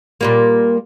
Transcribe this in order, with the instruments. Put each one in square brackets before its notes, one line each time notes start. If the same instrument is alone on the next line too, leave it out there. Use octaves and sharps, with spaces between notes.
[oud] A#2 G3 A#3